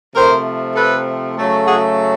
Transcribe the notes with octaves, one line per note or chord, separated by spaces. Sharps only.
C3 F3 A3 A#4 C5
A4 B4
C#3 F#3 A3
F#4 G#4